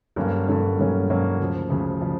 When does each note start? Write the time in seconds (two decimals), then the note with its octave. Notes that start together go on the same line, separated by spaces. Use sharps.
0.16 G2 D3 F#3 A#3 C#4
0.47 G2 D3 F#3 A#3 C#4
0.79 G2 D3 F#3 A#3 C#4
1.09 G2 D3 F#3 A#3 C#4
1.39 D2 C#3 F3
1.70 D2 C#3 F3
2.01 C#3 F3